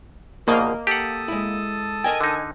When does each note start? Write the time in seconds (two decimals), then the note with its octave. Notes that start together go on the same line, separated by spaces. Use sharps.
0.48 A#1 B2 D#3 A#3 D#5
0.87 G4 A4 F#5 A5 D#6
1.28 G#3 E4
2.04 A#4 D#5 G5 G#5
2.21 D3 D#4